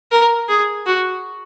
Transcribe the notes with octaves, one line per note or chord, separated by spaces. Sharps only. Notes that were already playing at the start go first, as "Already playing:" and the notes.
A#4
G#4
F#4